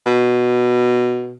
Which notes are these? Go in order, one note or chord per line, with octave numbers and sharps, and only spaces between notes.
B2